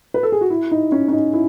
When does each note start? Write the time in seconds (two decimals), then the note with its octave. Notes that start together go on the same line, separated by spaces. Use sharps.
0.14 B4
0.23 A4
0.32 G#4
0.41 F#4
0.50 E4
0.71 D#4
0.92 C#4
1.08 C#4
1.12 D#4
1.34 E4